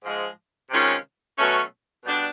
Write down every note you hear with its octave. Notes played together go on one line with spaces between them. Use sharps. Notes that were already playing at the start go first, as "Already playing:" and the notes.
G#2 F3 G#3
C3 D#3 G#3 C#4 F4
B2 F#3 A3 C#4
B2 G3 B3 D4